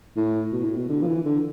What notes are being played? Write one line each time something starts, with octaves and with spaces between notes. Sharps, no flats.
A2
B2
A2
B2
D3
F3
E3
D3